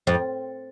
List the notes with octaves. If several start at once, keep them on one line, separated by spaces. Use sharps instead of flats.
F2